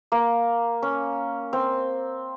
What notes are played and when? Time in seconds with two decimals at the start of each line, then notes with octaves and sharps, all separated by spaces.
0.12 A#3
0.82 C#4
1.53 C4